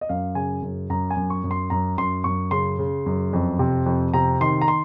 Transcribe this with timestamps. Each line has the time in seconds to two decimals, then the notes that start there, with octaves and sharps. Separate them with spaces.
0.01 D#5
0.09 F#2 F5
0.35 C#3 G#5
0.62 F#2
0.90 F#2 A#5
1.10 G#5
1.16 F#2
1.30 C#6
1.44 F#2
1.51 C6
1.70 F#2 A#5
1.98 F#2 C6
2.24 F#2 C#6
2.51 C#3 C6
2.79 C#3
3.06 F#2
3.33 F2
3.59 C3
3.86 F2
4.14 C3 A#5
4.41 D#3 C6
4.61 A#5
4.68 C6